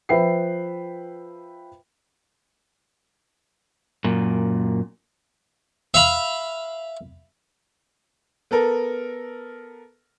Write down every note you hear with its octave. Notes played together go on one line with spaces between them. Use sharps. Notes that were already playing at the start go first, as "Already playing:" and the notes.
F3 B4 E5 G5 C7
F#2 A#2
E5 F5 B5
B3 A4 A#4